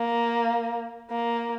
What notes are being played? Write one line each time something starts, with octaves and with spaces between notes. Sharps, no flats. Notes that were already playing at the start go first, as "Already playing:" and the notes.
Already playing: A#3
A#3